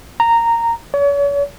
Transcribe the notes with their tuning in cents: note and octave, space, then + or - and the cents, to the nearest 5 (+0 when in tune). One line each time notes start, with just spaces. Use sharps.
A#5 -10
C#5 +40